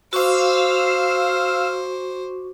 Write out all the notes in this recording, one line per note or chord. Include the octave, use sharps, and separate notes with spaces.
F#4 C5 F5 C#6 D6 E6